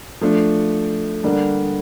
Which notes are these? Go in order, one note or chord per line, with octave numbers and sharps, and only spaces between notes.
F3 A3 D4
D3 G3 A#3 D4